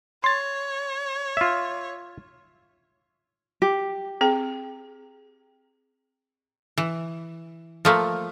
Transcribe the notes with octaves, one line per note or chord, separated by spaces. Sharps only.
C#5 C6 A6
F4 E5
G4
C4 G#4 G5
E3
F3 A3 A#3